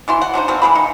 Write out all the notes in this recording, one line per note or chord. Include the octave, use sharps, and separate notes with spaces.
B2 E3 C6
F#5
F#3 D4 D#4 C5
B2 A#3 C4
E3 G#3 G#4 B5
D#4